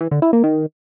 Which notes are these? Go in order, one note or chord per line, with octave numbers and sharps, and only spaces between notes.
E3
D3
E4
A#3
D#3